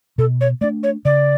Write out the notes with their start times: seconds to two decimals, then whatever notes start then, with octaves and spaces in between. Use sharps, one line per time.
0.18 B2 A4
0.41 C#5
0.61 A3 D4 D5
0.83 C#5
1.05 C#3 D5